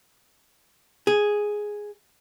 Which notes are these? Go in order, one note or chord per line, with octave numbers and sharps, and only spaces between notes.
G#4